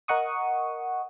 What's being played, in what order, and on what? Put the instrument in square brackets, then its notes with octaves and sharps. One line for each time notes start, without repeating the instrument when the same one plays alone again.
[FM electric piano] A#4 D#5 F#5 C#6 D#6